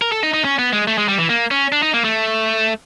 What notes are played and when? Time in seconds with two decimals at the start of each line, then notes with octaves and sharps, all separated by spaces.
0.02 A#4
0.12 A4
0.23 D#4
0.34 D#4
0.44 C#4
0.59 B3
0.73 G#3
0.88 A3
0.98 G#3
1.08 G3
1.19 E3
1.30 A#3
1.51 C#4
1.72 D4
1.83 D#4
1.94 A#3
2.04 A3